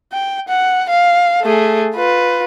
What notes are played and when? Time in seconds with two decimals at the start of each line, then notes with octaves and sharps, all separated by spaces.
0.12 G5
0.48 F#5
0.90 F5
1.42 A3 G#4
1.95 F4 B4